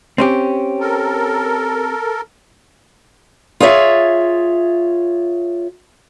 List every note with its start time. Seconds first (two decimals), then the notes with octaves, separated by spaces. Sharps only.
0.18 C4 C#4 G4
0.80 A4 A#4
3.60 F4 G#4 C#5 E5